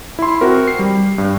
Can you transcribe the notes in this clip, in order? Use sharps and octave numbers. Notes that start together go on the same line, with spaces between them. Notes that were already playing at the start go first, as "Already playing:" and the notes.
E4 C6
C4 F#4 A#4
C7
G3
G2